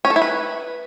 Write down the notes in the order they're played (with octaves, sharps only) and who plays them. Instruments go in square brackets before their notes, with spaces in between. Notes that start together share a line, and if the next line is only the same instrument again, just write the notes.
[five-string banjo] C#4
A4
E4
B4